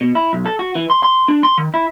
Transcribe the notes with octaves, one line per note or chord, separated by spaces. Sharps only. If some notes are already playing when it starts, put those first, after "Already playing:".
B2
E4
B1
A4
F#4
E3
C6
C6
D4
C6
D#3
E4